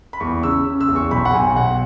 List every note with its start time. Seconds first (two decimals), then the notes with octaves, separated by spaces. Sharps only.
0.13 B5
0.20 E2 C#6
0.43 C#3 E6
0.66 C#3
0.81 E6
0.88 E2
0.96 C#6
1.11 B1 B5
1.25 F#5
1.33 B1 G#5
1.56 B1 F#5